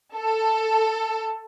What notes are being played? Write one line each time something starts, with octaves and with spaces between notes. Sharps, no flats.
A4